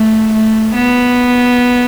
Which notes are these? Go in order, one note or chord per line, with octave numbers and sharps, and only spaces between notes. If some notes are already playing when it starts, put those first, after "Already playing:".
Already playing: A3
A3
B3